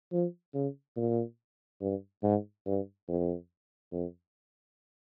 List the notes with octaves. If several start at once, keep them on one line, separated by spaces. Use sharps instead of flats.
F3
C#3
A#2
G2
G#2
G2
F2
F2